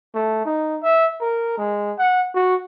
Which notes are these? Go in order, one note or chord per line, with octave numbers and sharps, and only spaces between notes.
A3
D#4
E5
A#4
G#3
F#5
F#4